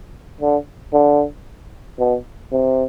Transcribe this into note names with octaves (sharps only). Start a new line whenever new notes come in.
D3
D3
B2
C3